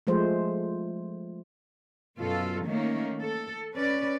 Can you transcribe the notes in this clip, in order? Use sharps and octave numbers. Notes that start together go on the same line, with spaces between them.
F3 G#3 A3 C5
F#2 B2 F4 A4
D#3 A3 A#3 C#4
A4
C#4 B4 D5